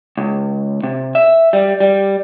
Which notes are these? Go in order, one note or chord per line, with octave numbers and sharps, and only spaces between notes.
C#2
C3
E5
G3
G3